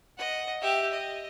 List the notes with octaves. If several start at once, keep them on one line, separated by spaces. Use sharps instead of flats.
D#5 F#5
G4 E5
D#5